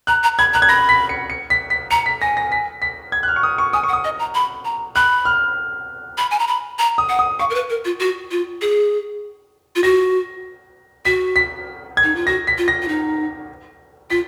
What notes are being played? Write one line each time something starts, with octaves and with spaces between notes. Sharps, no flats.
A#5 F#6
A#5
B5 G#6
A#5 F#6
G#6
B5 A#6
B6
C#7
C#7
B6
B6
A#5 C#7
B6
G#5 A#6
A#6
B6
B6
G#6
F#6
F6
C#6
D#6
C#6
G#5 D#6
C#6
F#5
D#6
D#5
A#5
B5
A#5
B5 F#6
F6
B5
G#5
A#5
B5
A#5
D#6
F#5
D#6
F5 C#6
A#4
B4
A#4
F4
F#4
F4
G#4
F4
F#4 A#6
F#4 B6
B6
G#6
D#4
F4
F#4 A#6
B6
F4
A#6
F4
D#4
F4 B6